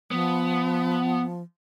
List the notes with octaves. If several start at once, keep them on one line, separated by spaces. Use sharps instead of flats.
F3 B3